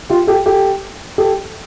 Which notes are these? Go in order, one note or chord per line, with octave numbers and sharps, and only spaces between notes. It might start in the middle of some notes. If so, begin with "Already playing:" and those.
F4 G4
G4 A4
G4 A4
G4 A4